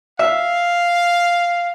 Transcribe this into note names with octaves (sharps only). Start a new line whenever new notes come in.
E5 F5